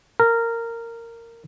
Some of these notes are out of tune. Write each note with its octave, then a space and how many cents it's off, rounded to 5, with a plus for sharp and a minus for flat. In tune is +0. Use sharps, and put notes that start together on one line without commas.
A#4 -15